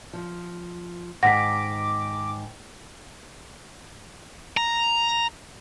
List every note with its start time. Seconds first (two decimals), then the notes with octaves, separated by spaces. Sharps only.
0.13 F3
1.23 G#2 D#3 F#5 D6 A#6 B6
4.57 A#5